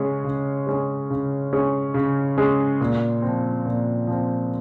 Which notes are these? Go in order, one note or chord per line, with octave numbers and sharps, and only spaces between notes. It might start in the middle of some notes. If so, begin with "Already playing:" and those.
Already playing: C#3 G#3 C#4 G#4
C#3
G#3 C#4 G#4
C#3
G#3 C#4 G#4
C#3
G#3 C#4 G#4
A#2
F3 C4
A#2
F3 C4